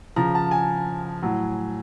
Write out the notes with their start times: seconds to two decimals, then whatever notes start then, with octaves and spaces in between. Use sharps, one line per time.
0.16 C#3 F3 A#5
0.35 A5
0.51 G#5
1.22 A2 F#3